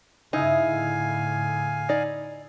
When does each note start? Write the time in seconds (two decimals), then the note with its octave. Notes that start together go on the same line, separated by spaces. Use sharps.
0.33 G2 C#3 D#4 E4 G#4 F5 G#5
0.68 A2 D3
1.89 D#4 D5